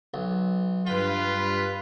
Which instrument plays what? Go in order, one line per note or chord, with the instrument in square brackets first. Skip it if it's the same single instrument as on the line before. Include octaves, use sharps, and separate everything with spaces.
[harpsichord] B1
[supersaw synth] G2 B4 B6 [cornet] F4 [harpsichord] G5